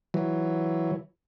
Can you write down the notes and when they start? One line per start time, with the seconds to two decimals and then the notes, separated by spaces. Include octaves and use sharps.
0.14 E3 F#3